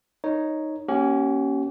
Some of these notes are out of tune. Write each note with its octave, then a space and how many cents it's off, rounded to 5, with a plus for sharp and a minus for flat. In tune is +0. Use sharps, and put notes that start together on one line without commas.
D#4 +0 A#4 +0 C#5 +0
A#3 +20 C#4 +0 G4 -45